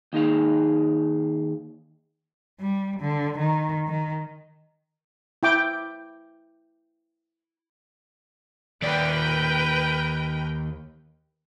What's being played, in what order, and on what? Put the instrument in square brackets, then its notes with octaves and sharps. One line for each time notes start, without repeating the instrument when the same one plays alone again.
[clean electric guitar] D#2 D#4 G#4 F5
[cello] G3
D3
D#3
D#3
[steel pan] E4 G5 D6
[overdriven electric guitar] D#2 D5 [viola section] A#4 B4 G5